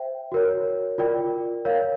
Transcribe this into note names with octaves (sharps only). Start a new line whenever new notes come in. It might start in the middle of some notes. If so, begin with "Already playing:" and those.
Already playing: C5 E5 G5
F#4 A#4 C#5
F4 A#4 D5 G5
A#4 C#5 F5